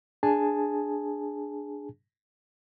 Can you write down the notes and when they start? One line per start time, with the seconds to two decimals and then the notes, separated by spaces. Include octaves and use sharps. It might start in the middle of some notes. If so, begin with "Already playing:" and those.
0.23 D4 G#4 G#5 A5